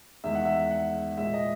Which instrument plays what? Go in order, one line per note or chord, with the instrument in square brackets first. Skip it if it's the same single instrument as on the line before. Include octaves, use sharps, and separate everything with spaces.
[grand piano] E2 D#3 G#3 E5
F#5
E5
F#5
A#2 G#3 E5
D#5